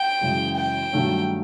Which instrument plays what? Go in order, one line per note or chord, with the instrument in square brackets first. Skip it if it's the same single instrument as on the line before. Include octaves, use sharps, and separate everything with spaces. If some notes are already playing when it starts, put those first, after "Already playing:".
Already playing: [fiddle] G5
[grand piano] F#2 C#3 E3 G#3
[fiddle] G5
[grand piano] G2 D#3 F#3 A3 C#4